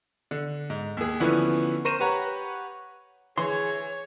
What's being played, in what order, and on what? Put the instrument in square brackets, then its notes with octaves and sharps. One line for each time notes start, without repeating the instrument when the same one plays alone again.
[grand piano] D3
G#2
D#2 G#4
D3 E3 F3 B3 C#4 E4
A#4 C5 C#6 A#6 D#7 E7
G4 B4 C#5 F#5 A#5
[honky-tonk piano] E3 [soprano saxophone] G#4 [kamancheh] C#5 [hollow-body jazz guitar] C6